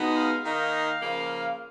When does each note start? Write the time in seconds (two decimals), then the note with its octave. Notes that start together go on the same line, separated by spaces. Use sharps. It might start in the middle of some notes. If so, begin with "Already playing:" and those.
Already playing: B2 G#3 B3 D#4
0.15 F5
0.44 D#3 A#3 D#4 F5
1.01 C#3 F3 A#3